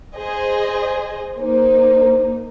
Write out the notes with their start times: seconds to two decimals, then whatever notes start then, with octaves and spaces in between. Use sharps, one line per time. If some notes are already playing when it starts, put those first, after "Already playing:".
0.17 G#4 C5 D#5
1.40 A#3 D#4 C5